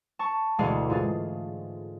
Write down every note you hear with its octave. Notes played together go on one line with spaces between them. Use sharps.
A5 C#6
E1 D2 G#3 G#4 D5 F5
G#2 F4 G#4 A6